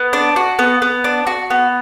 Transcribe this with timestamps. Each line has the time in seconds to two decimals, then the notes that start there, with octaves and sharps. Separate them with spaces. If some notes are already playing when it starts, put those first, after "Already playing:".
Already playing: B3
0.13 D4
0.36 F#4
0.59 B3
0.82 B3
1.04 D4
1.27 F#4
1.50 B3